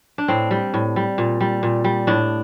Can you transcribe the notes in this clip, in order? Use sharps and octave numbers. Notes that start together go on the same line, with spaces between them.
D4
A2 C4
G3
A2
G3
A#2
G3
A#2
G3
A2 D4